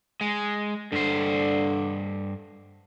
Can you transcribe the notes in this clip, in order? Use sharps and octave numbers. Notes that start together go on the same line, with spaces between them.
G#3
G2 D3 C5